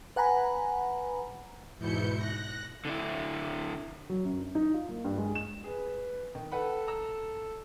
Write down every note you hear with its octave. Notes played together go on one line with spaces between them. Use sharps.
B4 F#5 G#5 A#5 B5
E2 G#2 B2 E4 G6 C#7
F#6 A#6
D3 D4 E4
F#3
F#2
D4
D#4
F4
A#3
G2
G#3
E7
G#4 B4
D#3
A4 B4 F#5 B5
A#5 E6